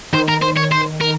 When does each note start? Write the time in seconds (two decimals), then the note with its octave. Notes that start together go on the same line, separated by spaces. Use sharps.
0.13 D#3 C5
0.29 A#4
0.42 C5
0.57 C#5
0.72 C5
1.01 A#4